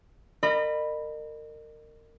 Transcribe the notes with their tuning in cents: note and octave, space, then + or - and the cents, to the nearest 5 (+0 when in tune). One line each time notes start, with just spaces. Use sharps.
A#4 -30 D#5 -40 B5 +0